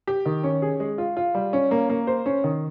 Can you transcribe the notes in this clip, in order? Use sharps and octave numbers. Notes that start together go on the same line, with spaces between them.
G4
D#3
C#4
G#4
G#3
F4
F4
G3
C#4
A#3
A#3
C5
C#4
D#3